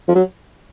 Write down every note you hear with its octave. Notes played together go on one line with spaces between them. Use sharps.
F3
F#3